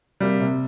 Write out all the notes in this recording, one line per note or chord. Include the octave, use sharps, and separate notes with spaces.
C3 G3 A#3
C3